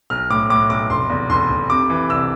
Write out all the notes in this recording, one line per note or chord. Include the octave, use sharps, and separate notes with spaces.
B1 F6
A2 D6
A2 D6
B1 D6
F1 C6
E2
F1 C6
F1
C3 D6
E3
C2 E6